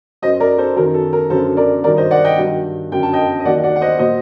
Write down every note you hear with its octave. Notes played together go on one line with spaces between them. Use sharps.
F#2 F#3 C5 D#5
A#4 D5
A4 C5
F#2 D#3 F#3 A#4
A4
A#4
F#2 D3 F#3 A4 C5
A#4 D5
G2 D#3 F#3 A#4 D5
C5 D#5
D5 F#5
D#5 G5
G2 D#3 F#3
F#2 D3 F#3 G5
A5
D#5 G5
D#5
D#2 D#3 F#3 D5 F#5
D5 F#5
F#5
C5 D#5
A#2 F#3 C5 D#5